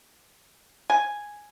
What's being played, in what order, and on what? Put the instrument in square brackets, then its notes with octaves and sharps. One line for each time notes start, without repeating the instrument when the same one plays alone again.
[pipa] G#5